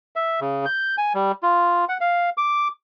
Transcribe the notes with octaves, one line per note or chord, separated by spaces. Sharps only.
E5
C#3
G6
G#5
G3
F4
F#5
F5
D6